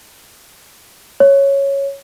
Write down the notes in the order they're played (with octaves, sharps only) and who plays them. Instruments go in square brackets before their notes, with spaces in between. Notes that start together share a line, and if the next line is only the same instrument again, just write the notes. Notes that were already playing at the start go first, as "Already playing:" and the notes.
[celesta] C#5